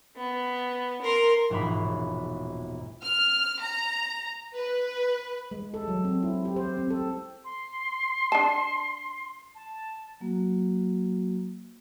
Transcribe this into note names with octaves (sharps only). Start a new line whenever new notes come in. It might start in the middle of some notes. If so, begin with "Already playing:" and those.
B3
A#4 C6
E1 A#1 G#2 C#5 B5
F6
A#5
B4
G#3
A4
F#3
C4
E4
G4
C5
C4
A4
C6
D4 A5
A5
F#3 A#3 F#4